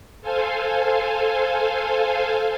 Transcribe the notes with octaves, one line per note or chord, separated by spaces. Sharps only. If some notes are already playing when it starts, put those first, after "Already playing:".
A4 C5 F5 G#5